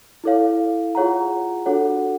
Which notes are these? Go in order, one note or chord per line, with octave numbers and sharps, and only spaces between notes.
E4 A4 C#5 F5
F4 G#4 C#5 F#5 A#5
D4 F#4 A4 C#5 F#5